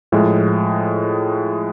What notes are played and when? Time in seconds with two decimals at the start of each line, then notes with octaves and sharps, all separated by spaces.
0.12 A2 F3 G#3